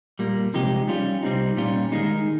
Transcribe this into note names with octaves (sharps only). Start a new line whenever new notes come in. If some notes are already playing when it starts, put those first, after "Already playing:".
A#2 G3 A#3
C3 F3 G#3 D#4 G4
G3 C#4 F4
C3 G3 C4 D#4
A#2 G3 C#4 F4
D#3 G#3 D#4